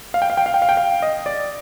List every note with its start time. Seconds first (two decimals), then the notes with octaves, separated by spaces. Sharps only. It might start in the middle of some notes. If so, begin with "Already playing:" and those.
0.14 F5
0.22 G5
0.30 F5
0.37 G5
0.46 F5
0.54 G5
0.62 F5
0.69 G5
0.77 F5
1.02 D#5
1.26 D5